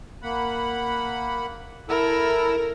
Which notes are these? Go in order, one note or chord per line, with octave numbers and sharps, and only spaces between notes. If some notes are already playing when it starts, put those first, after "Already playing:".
A#3 F#5 B5
E4 A4 A#4 E6